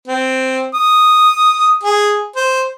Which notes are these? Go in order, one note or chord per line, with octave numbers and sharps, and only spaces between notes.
C4
D#6
G#4
C5